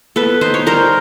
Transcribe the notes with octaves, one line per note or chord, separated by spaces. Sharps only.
B3 A4 B4
D#4 C5
C#5
G3 A#4 C5